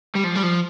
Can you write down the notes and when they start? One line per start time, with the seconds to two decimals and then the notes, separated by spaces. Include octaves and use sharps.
0.15 G3
0.25 F3
0.36 G3
0.43 F3